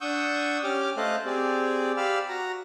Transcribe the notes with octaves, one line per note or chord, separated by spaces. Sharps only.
D4 F#5 C#6 D#6 E6 G6
C#4 G4 D6 F6
A3 A4 C5 D#5 F5 F#6
C4 G4 G#4 D5
G4 D5 F5 B5 E6 F6
F#4 A#5